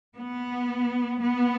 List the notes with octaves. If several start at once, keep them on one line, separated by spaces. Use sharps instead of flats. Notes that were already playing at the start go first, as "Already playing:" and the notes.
B3
B3